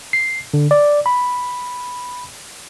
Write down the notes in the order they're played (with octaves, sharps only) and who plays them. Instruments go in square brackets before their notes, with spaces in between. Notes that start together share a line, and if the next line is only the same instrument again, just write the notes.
[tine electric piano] C7
D3
D5
B5